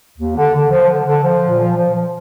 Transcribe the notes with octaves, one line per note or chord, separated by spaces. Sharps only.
D#2
D3
D3
F3
D3
D3
F3
A#2
F3
F3
F3